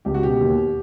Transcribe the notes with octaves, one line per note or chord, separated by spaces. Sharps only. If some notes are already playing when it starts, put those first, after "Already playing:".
C#2 G4
F#4
B2 G4
D#2